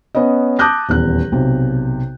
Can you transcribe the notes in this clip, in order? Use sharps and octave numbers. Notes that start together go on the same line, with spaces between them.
B3 C#4 B4 D#5
A5 D6 D#6 F#6 G6 A#6
D#1 E2 F#6
B1 C3